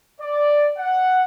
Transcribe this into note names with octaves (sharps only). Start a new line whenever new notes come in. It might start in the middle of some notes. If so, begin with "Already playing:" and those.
D5
F#5